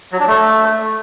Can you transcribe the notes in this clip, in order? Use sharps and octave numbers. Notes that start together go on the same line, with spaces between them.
F#3
D4
A3